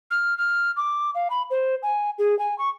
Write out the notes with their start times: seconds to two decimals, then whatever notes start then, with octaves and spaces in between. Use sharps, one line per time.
0.11 F6
0.38 F6
0.76 D6
1.15 F5
1.30 B5
1.50 C5
1.83 G#5
2.19 G#4
2.39 G#5
2.59 C#6